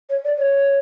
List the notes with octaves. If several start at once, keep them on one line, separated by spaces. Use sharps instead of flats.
C#5
D5
C#5